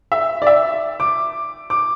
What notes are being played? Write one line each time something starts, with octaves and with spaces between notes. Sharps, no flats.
E5
D5
E5
D6
D6